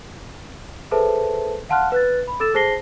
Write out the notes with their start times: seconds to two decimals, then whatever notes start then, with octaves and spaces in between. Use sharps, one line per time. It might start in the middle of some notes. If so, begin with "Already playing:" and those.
0.91 G#4 A4 B4 C5 E5 A5
1.69 F5 F#5 A5 C6 F6 F#6
1.92 B4 F#6 A6
2.28 B5
2.40 A4 E6 A6 E7
2.54 G#4 C5 A5 A#6 C7 G7